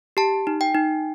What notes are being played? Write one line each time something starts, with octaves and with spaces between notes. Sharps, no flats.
G4 A5
D#4
G5
D#4